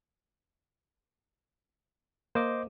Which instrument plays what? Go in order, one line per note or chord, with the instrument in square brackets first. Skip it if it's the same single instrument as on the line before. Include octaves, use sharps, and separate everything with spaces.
[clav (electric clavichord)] A#3 [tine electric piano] C5 D#5 D6